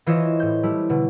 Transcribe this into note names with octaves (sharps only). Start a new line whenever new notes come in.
E3 F4 C5 C#5 D#5 E5
A2 G6
G3 A3 E4
B2 D3